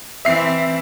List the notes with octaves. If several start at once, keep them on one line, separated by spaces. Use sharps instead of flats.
E3 C4 E5 C7